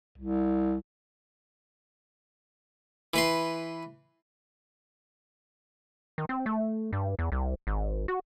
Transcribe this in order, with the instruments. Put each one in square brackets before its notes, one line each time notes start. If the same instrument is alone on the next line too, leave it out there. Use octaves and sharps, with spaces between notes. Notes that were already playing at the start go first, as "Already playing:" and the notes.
[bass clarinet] C2
[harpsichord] E3 B4 C6
[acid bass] D#3
C4
A3
G2
E2
C2
G#1
F#4